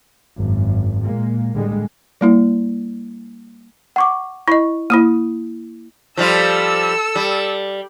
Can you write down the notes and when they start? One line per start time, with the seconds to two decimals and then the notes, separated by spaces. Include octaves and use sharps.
0.36 G#1 F#2
1.04 A#2 G#3 A#3
1.54 A2 D3 G3 G#3
2.21 G3 A#3 E4
3.96 F#5 C#6 D6
4.48 E4 D#5 C#6
4.90 A#3 E4 D#6 D#7
6.17 F3 G3 F4 A4 E6
7.15 G3